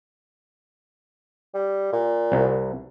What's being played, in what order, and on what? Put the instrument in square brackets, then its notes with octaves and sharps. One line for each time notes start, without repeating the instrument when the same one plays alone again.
[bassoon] G3
A#2
[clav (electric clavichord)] C2